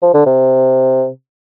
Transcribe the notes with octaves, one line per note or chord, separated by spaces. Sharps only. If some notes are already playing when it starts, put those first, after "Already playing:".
F3
D3
C3